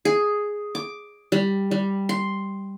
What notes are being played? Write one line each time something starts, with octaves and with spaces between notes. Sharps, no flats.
G#4
D6
G3
G3
C6